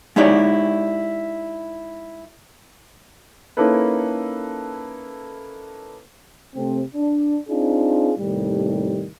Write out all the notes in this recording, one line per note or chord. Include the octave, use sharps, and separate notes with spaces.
G#3 D#4 E4 G4 C#5 D5
A#3 C#4 D#4 E4 A4 B4
C3 A3 C4
D4
C4 D4 D#4 F4 G#4
D#2 A2 C3 D#3 G3